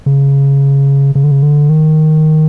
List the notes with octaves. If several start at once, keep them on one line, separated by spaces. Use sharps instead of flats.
C#3
C#3
D3
C#3
D3
D#3